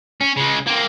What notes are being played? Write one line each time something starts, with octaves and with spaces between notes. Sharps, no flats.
C#4
C#3 G#3
A#3 C4